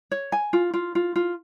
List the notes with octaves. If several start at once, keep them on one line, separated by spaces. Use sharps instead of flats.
C#5
G#5
F4
F4
F4
F4